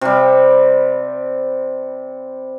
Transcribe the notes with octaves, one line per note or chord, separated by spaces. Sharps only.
C3 G3